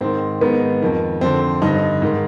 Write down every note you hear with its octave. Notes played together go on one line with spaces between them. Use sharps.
G#2 D#3 C4
G#2 D#3 B3
F2 D#3
F2 D3 C4
G2 D3 D#4
G#2 D#3